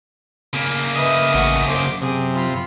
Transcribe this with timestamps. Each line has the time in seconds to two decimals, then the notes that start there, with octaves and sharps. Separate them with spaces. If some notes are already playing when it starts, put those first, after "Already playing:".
0.53 C#3 A#3
0.95 B4 D#5 E5 D#6
1.34 A1 F#4
1.68 F#2 C5 D6
2.01 C3 G#4
2.35 F4 B5